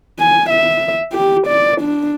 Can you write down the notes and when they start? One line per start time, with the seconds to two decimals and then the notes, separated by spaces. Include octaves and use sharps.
0.19 G#5
0.50 E5
1.12 G4
1.47 D5
1.81 D4